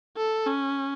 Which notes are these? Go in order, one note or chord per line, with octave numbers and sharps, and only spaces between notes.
A4
C#4